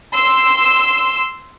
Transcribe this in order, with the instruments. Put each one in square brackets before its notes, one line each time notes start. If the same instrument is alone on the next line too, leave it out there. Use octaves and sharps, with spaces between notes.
[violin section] C6 E6